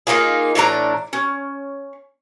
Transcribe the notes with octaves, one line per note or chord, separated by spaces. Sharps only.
A#3 D#4 F4 G#4
A2 E3 D4 A#5
C#4